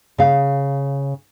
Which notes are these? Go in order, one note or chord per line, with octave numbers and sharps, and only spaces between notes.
C#3 F5